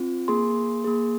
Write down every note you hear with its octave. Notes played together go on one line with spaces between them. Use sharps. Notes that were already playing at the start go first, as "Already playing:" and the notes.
Already playing: C4 F4
A#3 G#4 C6
A#3 G#4